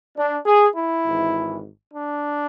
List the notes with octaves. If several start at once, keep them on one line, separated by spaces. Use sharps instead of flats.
D4
G#4
E4
G#1 G#2 E3
D4